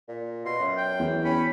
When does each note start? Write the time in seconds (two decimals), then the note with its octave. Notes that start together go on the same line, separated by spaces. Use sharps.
0.08 A#2
0.46 B2 C6
0.59 F#2
0.77 G5
0.99 E2
1.25 C#4 B5